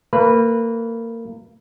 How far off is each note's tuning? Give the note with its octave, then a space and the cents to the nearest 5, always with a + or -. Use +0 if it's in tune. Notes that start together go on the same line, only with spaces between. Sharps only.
A#3 -30 B4 -10